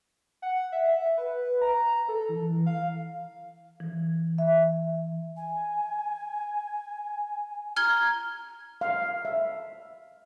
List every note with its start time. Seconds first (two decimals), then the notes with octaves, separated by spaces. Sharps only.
0.42 F#5
0.72 E5
1.17 B4
1.62 A#5
2.09 A4
2.29 E3
2.66 F5
3.80 E3
4.38 E5
5.37 G#5
7.77 A#5 F6 G#6 G7
8.81 F5
9.25 E5